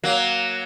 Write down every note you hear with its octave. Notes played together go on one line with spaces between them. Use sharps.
F#3 A#3